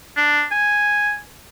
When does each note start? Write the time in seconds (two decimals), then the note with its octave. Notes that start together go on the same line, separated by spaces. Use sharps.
0.17 D4
0.51 G#5